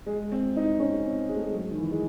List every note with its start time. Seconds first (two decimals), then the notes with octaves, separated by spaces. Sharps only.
0.06 G#3
0.32 C4
0.56 D#4
0.79 C#4
1.05 C4
1.29 G#3
1.36 A3
1.43 G#3
1.53 F#3
1.71 D#3
1.77 E3
1.92 G#3